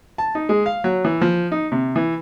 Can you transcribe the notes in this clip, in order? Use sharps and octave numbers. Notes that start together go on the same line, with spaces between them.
A5
D#4
G#3
F5
F#3
E3
F3
D#4
C3
E3